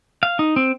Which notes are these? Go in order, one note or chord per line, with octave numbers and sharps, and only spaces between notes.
F5
D#4
C4